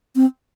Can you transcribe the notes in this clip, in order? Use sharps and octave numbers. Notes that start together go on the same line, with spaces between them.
C4